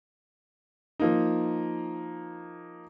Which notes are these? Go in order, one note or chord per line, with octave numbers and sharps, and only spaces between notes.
F3 A#3 D#4